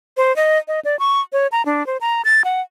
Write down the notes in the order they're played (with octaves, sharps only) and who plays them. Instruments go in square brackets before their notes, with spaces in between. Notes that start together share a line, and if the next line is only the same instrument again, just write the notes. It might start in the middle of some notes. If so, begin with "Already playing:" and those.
[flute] C5
D#5
D#5
D5
C#6
C#5
A#5
D4
C5
A#5
A6
F#5